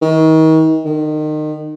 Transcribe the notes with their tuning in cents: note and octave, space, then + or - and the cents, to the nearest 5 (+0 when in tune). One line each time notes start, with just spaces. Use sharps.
D#3 +35
D#3 -30